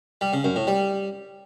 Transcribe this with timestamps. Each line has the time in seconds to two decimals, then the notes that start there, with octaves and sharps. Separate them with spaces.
0.21 G3
0.33 C#3
0.44 F#2
0.56 A2
0.67 G3